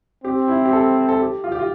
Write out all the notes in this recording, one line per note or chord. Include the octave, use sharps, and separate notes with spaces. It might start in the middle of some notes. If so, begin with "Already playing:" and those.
C4 G4
E4
G4
A4
A4
G4
F4
G4
F4